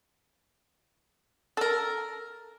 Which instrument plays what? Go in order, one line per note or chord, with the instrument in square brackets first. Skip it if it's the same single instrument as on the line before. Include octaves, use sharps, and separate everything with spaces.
[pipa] A4 A#4